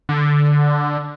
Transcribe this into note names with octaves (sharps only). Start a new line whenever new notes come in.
D3